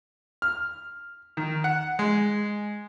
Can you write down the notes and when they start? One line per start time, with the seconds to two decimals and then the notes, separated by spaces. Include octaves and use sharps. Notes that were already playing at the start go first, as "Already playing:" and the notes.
0.42 F6
1.37 D#3
1.64 F#5
1.99 G#3